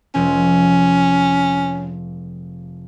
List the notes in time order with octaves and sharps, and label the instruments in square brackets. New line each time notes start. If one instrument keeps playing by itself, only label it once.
[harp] F1 F3 G#3 [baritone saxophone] C#4